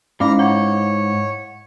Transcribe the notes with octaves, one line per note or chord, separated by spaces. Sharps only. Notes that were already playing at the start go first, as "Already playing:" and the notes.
G#2 C#4 E4 F5 A#5 B5 D6 F6
C#5 F#5